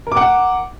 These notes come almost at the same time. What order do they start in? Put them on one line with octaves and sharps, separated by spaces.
A#4 D6 F#5